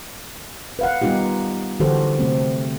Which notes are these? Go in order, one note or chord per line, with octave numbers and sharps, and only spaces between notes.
B4 F5 F#5
G3 B3 D#4 F4 G4
D3 E3 F#4 G4 A4 C5
C3 A3 C4